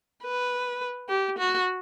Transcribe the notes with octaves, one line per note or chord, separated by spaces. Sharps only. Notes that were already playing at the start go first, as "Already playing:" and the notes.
B4
G4
F#4